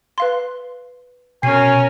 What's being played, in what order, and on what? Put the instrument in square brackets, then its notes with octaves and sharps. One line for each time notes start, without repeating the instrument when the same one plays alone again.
[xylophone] B4 F5 C6
[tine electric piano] B2 [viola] C#4 A#4 [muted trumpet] G#5 [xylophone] C7